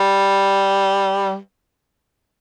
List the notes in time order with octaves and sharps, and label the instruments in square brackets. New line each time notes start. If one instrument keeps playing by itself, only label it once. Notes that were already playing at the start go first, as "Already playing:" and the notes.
Already playing: [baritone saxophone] G3